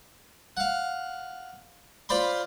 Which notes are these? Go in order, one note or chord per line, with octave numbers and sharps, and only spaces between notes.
F5 F#5
F4 C5 D5 B5 C6